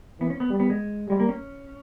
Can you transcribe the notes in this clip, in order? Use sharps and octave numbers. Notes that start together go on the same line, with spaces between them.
E3 B3
C#4
B3
G3
B3
G#3
G3 G#3
A#3
C#4